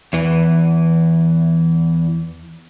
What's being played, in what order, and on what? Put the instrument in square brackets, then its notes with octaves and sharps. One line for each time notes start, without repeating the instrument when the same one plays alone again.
[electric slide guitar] E2 E3